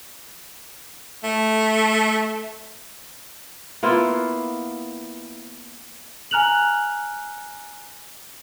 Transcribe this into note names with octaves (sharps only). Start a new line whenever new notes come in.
A3
A#3 B3 E4 F4
G#5 A#5 F6 F#6 F7 F#7